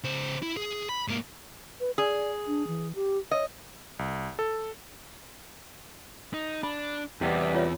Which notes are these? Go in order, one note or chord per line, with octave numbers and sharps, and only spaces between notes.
C#3 C5
E4
G#4
B5
G#2 A#3
B4
G#4 D5
D4
E3
G4
C#5 D#5
C2
A4
D#4
D4 B5
E2 C3 G3 B3 E4
F4 C#5